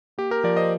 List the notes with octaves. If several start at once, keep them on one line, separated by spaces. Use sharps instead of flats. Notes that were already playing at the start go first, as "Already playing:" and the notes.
A#3 G4
G4 A#4
F3 A#4 D5
C5 D#5